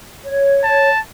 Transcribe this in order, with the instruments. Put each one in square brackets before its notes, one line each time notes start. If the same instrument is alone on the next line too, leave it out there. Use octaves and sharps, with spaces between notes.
[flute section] C#5
[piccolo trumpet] A5